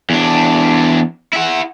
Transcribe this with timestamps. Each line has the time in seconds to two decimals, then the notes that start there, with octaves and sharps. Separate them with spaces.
0.10 E2 D4
1.33 E4 F#5